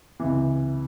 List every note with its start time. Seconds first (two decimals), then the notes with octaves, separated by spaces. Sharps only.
0.20 C#2 C3 E3